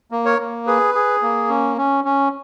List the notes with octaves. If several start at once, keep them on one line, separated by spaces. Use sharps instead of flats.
A#3
A#4 C#5
A#3
G#4 B4
G#4
A#3
C#4
C#4
C#4